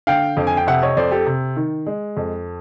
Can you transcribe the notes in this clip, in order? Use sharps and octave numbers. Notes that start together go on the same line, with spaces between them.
D3 F5 G5
F2
G#5
G5
C3 E5 F#5
C#5 D#5
F2 C5 D5
G4 A4
C3
D#3
G#3
F2